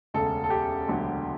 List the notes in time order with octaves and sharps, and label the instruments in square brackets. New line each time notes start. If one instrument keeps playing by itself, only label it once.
[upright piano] E1 D2 C#3 A4
A4
G4
E1 D2 D3 F#3